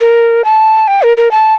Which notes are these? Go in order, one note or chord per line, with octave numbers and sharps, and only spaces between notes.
A#4
A5
G5
A#4
A#4
A5